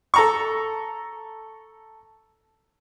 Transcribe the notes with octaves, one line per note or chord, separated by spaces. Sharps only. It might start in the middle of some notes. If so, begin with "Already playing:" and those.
A4 A#5 C#6